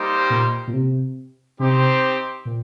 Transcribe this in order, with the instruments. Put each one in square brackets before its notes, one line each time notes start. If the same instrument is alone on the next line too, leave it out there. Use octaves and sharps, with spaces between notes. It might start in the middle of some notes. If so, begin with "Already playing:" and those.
Already playing: [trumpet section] G3 A#3 D#4 G4 C5
[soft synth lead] A#2
A#2
C3
[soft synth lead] C3 [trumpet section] C4 D#4 G4 C5
[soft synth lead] A#2